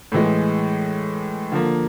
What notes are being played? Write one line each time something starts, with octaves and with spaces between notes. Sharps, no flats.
A2 E3 G#3
D3 F3 A#3